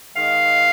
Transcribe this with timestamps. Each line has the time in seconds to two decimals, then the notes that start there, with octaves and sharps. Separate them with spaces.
0.16 D#3 G#3 F5